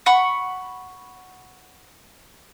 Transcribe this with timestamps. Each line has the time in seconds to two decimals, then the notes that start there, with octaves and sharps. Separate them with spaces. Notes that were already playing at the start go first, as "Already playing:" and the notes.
0.06 F#5 B5 C#6